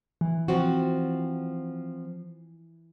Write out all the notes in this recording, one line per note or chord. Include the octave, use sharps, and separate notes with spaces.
E3
F3 C4 F#4